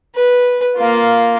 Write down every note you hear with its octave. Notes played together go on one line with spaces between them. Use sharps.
B4
A#3 F4